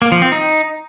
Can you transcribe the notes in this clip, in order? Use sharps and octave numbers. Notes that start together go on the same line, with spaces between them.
A#3
F3
C4
D#4